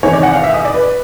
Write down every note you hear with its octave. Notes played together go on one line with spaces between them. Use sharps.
E2 C3 D#3 C#5
D5
F#5
F5
E5
D#5
D5
B4